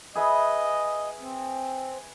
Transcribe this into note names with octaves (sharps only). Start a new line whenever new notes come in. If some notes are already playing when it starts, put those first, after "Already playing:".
G#4 B4 D#5 E5
C4